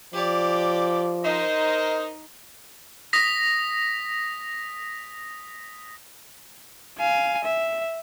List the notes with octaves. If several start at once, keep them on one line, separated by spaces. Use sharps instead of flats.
F3 G4 D5
D#4 A#4 C5 D#5
D#6 A#6 B6
F5 G#5
E5